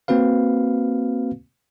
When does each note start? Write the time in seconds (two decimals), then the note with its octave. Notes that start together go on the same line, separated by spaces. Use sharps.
0.08 A#3 C4 F#4 B4 F5